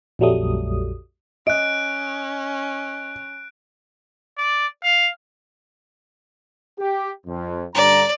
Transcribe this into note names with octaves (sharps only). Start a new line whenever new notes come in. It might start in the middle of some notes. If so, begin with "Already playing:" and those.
A#1 F2 F#3 G3 A3 D#6
C#4 D#5 F#6 D7
D5
F5
G4
F2
G2 D3 D5 A#5